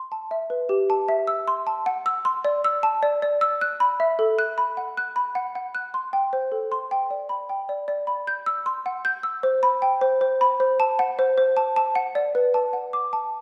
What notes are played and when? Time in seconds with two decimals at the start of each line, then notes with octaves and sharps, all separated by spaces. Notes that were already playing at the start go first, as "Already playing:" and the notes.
Already playing: C6
0.12 A5
0.31 E5
0.50 B4
0.69 G4
0.90 A5
1.08 E5
1.27 E6
1.48 C6
1.67 A5
1.86 F#5
2.06 E6
2.25 C6
2.45 D5
2.64 E6
2.83 A5
3.03 D5
3.22 D5
3.41 E6
3.61 F#6
3.80 B5
4.00 E5
4.19 A4
4.39 F#6
4.58 B5
4.77 F#5
4.97 F#6
5.16 B5
5.35 F#5
5.55 F#5
5.75 F#6
5.94 C6
6.13 G5
6.33 C5
6.52 A4
6.72 C6
6.91 G5
7.11 D5
7.29 B5
7.49 G5
7.69 D5
7.88 D5
8.07 B5
8.27 G6
8.46 E6
8.66 C6
8.86 F#5
9.05 G6
9.23 E6
9.43 C5
9.63 B5
9.82 G5
10.01 C5
10.21 C5
10.41 B5
10.60 C5
10.80 A5
10.99 F#5
11.19 C5
11.38 C5
11.57 A5
11.76 A5
11.95 F#5
12.15 D5
12.35 B4
12.54 A5
12.73 F#5
12.93 D6
13.13 A5